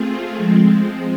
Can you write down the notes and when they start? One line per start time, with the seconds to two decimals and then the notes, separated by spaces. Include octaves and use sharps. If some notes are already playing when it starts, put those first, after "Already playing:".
Already playing: A3 C4 F4 G#4
0.36 F3 G#3 C4